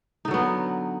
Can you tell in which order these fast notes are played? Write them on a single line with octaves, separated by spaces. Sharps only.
D#4 D3 F#3 B3